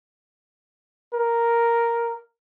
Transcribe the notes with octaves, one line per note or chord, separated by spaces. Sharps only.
A#4